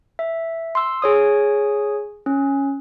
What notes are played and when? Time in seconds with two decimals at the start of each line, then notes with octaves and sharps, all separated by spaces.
0.19 E5
0.75 C6 E6
1.02 G#4 C#5 D#6
2.26 C#4